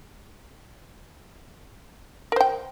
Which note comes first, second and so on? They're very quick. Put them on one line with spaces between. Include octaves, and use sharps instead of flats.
A#4 C5 G5